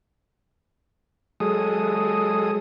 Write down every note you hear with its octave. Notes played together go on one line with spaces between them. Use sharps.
F#3 G#3 G#4 A4 D#6